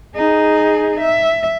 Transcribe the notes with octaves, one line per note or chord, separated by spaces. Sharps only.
D#4 G#4
E5